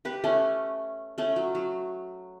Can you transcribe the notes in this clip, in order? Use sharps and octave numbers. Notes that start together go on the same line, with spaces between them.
G4 B4
A3 C#4
A3 C#4
F#3
F#3